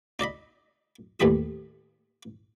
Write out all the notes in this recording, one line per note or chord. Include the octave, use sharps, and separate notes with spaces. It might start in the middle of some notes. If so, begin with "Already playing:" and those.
D#4 D5 D#5 B5
D#2 A2 E3 G3 B5 D#6